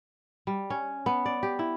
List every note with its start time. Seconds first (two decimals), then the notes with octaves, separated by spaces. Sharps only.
0.47 G3
0.70 C#4
1.06 B3
1.26 D5
1.43 G4
1.59 E4